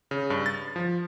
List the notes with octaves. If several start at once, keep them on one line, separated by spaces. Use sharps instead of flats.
C#3
G2
A6
F3